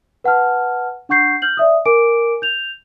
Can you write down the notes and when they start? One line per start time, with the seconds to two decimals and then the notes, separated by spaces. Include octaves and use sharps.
0.24 B4 F#5 A5 F6
1.09 D4 F#5 C#6 G6 C7
1.42 F6 G6 F#7
1.57 D5 E5 D#6
1.86 A#4 G#5 D6 D7
2.42 G6 F7